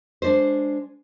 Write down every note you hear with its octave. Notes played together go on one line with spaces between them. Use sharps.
G#3 D4 C5